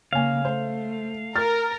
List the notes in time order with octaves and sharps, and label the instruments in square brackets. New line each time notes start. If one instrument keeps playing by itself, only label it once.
[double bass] C#3 A#3 [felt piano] C#5 G#5 [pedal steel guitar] F5
[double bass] A3 [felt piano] C5
[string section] A#4 [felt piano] F6 A6